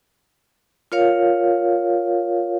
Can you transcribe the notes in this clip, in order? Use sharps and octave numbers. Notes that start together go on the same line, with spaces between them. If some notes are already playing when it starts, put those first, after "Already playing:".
F4 A#4 C#5 F5